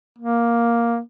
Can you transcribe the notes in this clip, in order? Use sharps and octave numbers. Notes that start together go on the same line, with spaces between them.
A#3